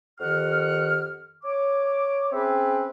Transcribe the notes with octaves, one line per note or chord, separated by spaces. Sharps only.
F2 D#3 G4 F#5 F6
C#5 D6
C4 C#4 G#4 B4 E5 G5